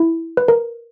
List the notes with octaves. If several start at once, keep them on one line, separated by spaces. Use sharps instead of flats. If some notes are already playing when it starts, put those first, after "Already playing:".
Already playing: E4
B4
A#4